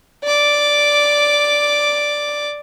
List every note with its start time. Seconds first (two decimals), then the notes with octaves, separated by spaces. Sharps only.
0.24 D5 D6